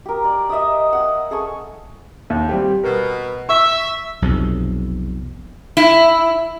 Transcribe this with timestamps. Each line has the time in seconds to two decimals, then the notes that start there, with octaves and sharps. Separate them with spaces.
0.06 G4 A#4
0.24 D5
0.49 D#5 E5 G5 D#6
0.93 F#5 G#5
1.31 G#4 A4 G#5 C#6
2.30 D#2
2.49 G3 C4 G4
2.84 B2 A#4
3.49 E5 C#6
4.22 B1 F2 C3
5.77 E4